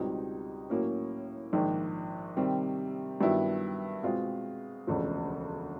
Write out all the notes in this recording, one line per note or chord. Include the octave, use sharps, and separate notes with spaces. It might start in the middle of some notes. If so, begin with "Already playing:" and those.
Already playing: C#2 B2 G3 C4 D#4
A2 F#3 A#3 C#4
A#1 G#2 D#3
C3 D#3 G3 C4
G2 D#3 F#3 B3 E4
B2 G#3 C4 F4
E1 D2 C#3 F3